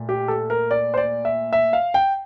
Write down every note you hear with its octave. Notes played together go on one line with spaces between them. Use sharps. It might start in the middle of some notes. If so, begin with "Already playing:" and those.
Already playing: A#2 A3
G4
A4
A#4
D5
C5
D5
E5
E5
F5
G5